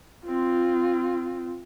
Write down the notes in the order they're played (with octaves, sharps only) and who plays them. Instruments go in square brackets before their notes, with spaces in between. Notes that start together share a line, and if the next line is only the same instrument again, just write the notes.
[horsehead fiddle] C4 F4